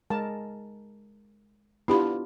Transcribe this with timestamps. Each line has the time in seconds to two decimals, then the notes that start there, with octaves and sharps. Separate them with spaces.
0.10 G#3 A#4 A5
1.88 B3 D4 E4 F4 G4 B5